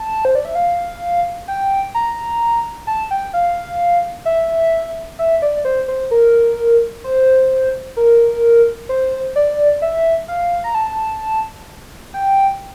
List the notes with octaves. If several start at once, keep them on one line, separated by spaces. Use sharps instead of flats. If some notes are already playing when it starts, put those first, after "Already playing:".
Already playing: A5
C5
D5
E5
F5
G5
A#5
A5
G5
F5
E5
E5
D5
C5
C5
A#4
C5
A#4
C5
D5
E5
F5
A#5
A5
G5